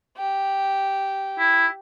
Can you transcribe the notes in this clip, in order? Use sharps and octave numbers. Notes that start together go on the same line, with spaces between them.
G4
E4